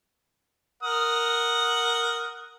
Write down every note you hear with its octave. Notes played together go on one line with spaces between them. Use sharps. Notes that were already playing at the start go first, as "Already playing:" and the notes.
A#4 F#5 D#6